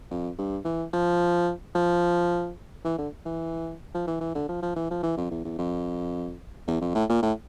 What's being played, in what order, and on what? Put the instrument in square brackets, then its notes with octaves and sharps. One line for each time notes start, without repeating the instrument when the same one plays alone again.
[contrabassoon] F2
G2
E3
F3
F3
E3
D3
E3
F3
E3
E3
D3
F3
F3
E3
F3
E3
F2
E2
E2
F2
E2
F2
A2
A#2
A2